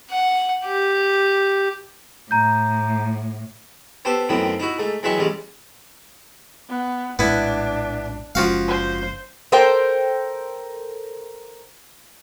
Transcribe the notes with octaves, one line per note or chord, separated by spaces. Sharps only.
F#5
G4
A2 A#5 G6
B3 G4 A4 C5
F#2 A2 D#3 B3 C4
D#4 E4 F#4
G#2 A3
E2 F#3 G#3 E5 G5 C#6
A1 G3 G#3 C#4
B3
A#1 A2 G#3 B3 D4 E4
F#1 F3 G#3 C#4 F#4 F5
C5
A4 A#4 C5 G5